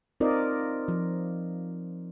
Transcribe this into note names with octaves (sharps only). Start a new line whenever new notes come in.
C4 D#4 F4 A#4 D5 D#5
F3